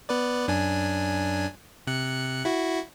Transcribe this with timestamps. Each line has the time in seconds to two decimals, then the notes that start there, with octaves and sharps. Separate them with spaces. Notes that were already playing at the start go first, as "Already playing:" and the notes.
0.09 B3 B4 D5
0.48 F#2 D4 G#5
1.87 C3 F#6 C#7
2.45 E4 F#4